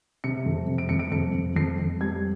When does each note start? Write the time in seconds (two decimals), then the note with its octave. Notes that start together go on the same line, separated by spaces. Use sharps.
0.24 C3 C#7
0.46 F2
0.67 C3
0.78 D7
0.89 F2 C#7
0.99 D7
1.11 F2 C#7
1.34 F2
1.56 F2 C7
1.79 F2
2.01 G3 G#6